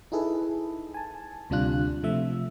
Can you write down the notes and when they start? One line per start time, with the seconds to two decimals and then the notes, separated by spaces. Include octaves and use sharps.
0.12 D#4 E4 G#4 A4 B4
0.94 G#5 A5
1.50 D2 C3 G3 D4 F4 F#6
2.03 C3 F3 A3 E5